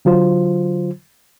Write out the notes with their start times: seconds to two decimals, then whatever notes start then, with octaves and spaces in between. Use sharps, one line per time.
0.05 D3 F#3 F4 C5